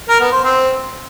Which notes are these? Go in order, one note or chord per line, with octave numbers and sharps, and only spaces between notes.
A#4
B3
C5
C4